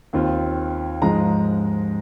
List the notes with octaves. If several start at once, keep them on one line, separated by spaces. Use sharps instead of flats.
D#2 D#3 C4 F4
G#2 F3 G#3 A#5